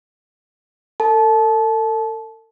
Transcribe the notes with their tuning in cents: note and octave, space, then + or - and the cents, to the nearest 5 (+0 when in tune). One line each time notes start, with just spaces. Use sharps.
A4 +40 A5 -25